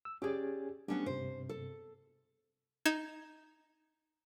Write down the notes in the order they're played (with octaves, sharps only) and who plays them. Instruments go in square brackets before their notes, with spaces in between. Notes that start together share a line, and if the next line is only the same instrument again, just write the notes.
[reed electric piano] E6
[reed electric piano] C#4 G#4 G#5 [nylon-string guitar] G4 D5
[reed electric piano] G3 A3 [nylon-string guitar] B3 C#4 D4
[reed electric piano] G2 C3 [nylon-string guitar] C5
[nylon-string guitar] A4
[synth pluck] D#4 G#6 E7